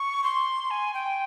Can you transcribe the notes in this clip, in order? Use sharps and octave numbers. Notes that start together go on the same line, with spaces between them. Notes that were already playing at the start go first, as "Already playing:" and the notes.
Already playing: C#6
C6
G#5
G5